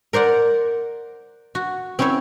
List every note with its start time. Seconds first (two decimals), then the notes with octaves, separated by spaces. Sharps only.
0.13 A#4 C5 D5 F#5
1.55 F#4
1.99 C4 C#4 E4 C5 C#5